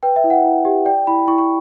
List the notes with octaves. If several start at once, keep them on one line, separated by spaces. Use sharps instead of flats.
B4 G5
E5
E4
F#5
E4
G4
D5 G5
E4 B5
E4 C#6
C#6